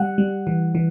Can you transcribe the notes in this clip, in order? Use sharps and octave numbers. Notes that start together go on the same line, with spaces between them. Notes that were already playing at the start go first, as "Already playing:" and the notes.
Already playing: G3 F#5
G3
E3
E3